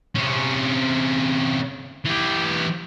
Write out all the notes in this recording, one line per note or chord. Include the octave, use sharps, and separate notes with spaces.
C3 C#4
E3 G4